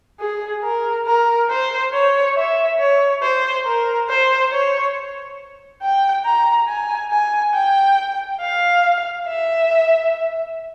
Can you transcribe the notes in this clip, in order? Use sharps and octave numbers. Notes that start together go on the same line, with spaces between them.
G#4
A#4
A#4
C5
C#5
E5
C#5
C5
A#4
C5
C#5
G5
A#5
G#5
G#5
G5
F5
E5